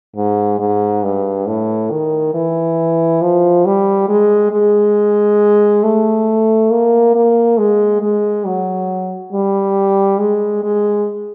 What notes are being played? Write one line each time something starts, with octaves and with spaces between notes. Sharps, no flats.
G#2
G#2
G2
A2
D#3
E3
F3
G3
G#3
G#3
A3
A#3
A#3
G#3
G#3
F#3
G3
G#3
G#3